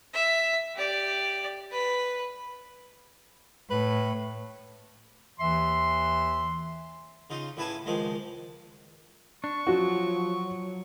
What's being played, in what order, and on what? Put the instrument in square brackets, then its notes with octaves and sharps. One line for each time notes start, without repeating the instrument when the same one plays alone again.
[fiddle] E5
G4 D5
B4
[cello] A2 [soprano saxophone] B4
[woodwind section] D#2 E3 E5 C6
[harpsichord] C#3 D#4 F4
A2 C#3 E4 B4 G#5 A5
C#2 D#3 F3 G#3 D6
[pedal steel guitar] D4 [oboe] C#6
[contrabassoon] F3 [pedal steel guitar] F#3 [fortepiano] F#4